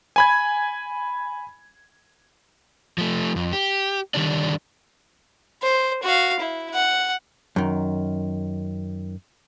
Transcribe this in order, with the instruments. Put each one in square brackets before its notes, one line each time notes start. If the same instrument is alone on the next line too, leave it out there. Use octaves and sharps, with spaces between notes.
[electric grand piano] G#5 B5 G#6
[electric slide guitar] F3 A3
F2
G4
D3 D#3 G3 D4 D5
[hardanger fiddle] C5
F#4 F5
E4
F#5
[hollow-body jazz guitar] F#2 D#3